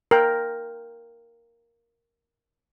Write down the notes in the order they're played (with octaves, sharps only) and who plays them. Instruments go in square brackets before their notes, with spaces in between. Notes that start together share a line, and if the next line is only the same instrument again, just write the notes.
[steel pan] A#4 G5